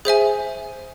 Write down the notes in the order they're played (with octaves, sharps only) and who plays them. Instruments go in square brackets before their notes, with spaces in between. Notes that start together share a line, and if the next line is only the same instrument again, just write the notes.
[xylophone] G#4 C5 E5 G#5